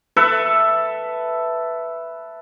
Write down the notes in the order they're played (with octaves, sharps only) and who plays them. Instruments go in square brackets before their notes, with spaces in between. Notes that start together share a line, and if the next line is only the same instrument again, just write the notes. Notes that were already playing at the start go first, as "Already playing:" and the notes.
[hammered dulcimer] A4 B4 E5